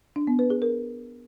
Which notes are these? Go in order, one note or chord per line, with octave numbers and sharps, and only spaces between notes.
D4
B3
B4
G#4
A#4